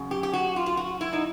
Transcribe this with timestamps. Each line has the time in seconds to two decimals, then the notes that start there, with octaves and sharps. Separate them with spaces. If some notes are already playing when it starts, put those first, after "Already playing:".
Already playing: F#2 C#3
0.11 G4
0.23 G4
0.33 F#4
0.56 F4
0.66 F4
0.77 F#4
1.01 E4
1.13 D#4